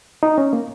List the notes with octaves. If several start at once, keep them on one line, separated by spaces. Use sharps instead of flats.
D#4
C#4
A#3